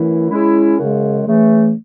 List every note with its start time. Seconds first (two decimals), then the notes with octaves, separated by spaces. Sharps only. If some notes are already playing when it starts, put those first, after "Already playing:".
Already playing: F#2 E3 A3 E4
0.30 C#3 G#3 C#4 E4
0.78 F#2 C#3 G#3
1.26 C#3 E3 A3